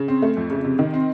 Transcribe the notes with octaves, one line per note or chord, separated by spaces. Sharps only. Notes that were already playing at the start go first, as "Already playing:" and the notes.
Already playing: C#3
C4
A3
F2
C#3
C3
D#3
C4